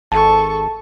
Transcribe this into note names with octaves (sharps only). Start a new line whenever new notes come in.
G#1 A4 A5 C#6